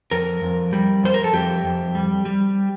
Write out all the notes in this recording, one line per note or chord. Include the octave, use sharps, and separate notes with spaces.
F2 A#4
F2
G3
F2 C5
A#4
A4
F2 G4
F2
G3
G3